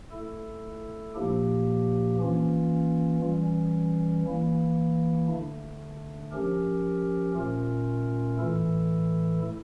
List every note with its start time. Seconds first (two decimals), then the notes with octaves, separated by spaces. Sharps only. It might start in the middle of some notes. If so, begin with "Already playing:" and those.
0.11 A3 E4 A4
1.15 A#2 F3 A#3 D4 G4
2.18 E3 A#3 C#4 F4
3.21 E3 G3 C#4
4.25 E3 A#3 E4
5.28 D3 A3 D4
6.32 F3 C#4 G4 A#4
7.35 A#2 A3 C#4 F4 A#4
8.38 A2 E3 A3 E4 A4